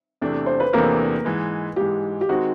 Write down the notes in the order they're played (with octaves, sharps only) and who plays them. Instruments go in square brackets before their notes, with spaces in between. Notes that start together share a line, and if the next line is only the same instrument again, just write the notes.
[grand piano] E2 C3 E3 A3 D4
[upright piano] C5
B4
[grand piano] E2 C3 E3 A3 D4 [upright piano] A#3 A#4
[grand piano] G#2 E3 G#3
[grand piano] G#2 E3 G#3 [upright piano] G4
[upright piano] G4
[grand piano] D#3 G#3 C4 D#4 [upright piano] F#4